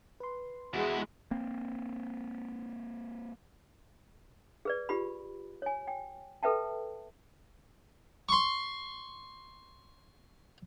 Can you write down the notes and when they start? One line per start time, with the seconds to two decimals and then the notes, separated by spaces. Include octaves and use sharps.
0.20 B4 C6
0.74 E2 G#3 E4 F#4
1.31 A#3 C4
4.65 G#4 B4 D5
4.89 F4 G4 B5
5.62 C#5 G#5
5.88 G5
6.43 A4 B4 E5 G5 A5
8.29 C6 C#6